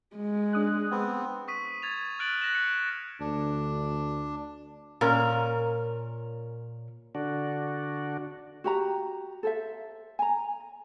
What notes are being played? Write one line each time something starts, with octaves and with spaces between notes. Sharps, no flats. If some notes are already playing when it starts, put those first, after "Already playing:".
G#3
D4 D#6 F#6
B3 C4
C#6 D#6 B6 D#7
G#6 A6 F7
F6 F#6 A6 D7 F#7
F#6 A#6 E7
C#7
D2 D4
A#2 C#4 A#4
D3 D4 F#4
F#4 G4 A#5
A4 C5 E5
G#5 A#5